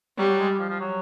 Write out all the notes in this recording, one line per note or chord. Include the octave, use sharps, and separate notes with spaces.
F#3 G3
F#3
G#3
G3
F3
F3
F#3